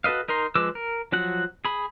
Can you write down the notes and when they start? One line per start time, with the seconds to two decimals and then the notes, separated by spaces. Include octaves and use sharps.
0.04 F#4 A4 B4 D#5 F5
0.28 D#4 A#4 A#5 C6
0.55 F3 G#3 B4 D6 E6
0.75 A#4
1.12 F3 F#3 F#4 F#5
1.65 G#4 B5